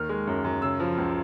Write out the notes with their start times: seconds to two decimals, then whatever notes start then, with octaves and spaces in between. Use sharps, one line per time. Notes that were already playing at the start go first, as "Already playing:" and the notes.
Already playing: D#2 D#3 F6
0.09 G#3
0.27 F#2
0.44 F#2
0.62 C#3 E6
0.80 F3
0.98 C#2